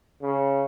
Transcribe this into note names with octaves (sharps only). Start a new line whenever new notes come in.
C#3